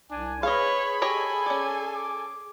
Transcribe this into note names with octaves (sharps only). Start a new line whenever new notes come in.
C2 D4 G#5
G#4 B4 C#5 D#5 F5 B5
G4 A4 C#5 D#5 G#5
C#4 D5
D6